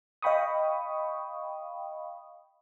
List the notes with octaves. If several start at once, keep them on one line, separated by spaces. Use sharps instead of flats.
D#5 F5 G5 B5 C#6 D#6